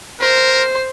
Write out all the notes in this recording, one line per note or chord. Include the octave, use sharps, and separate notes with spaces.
A#4 C5